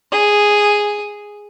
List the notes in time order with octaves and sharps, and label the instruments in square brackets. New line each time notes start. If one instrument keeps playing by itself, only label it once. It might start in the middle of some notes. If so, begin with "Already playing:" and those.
[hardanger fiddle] G#4